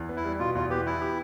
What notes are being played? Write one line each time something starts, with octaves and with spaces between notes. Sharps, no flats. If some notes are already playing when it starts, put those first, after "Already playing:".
Already playing: E2
B3
E4
G3
B2 F4
E2 F4
B3 G4
E3 E4
G4